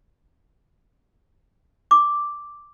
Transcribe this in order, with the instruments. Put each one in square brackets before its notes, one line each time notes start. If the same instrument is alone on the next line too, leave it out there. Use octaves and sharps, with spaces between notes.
[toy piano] D6